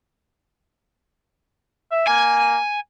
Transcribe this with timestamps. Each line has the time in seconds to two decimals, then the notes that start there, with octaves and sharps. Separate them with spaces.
1.91 E5
2.08 A#3 G#5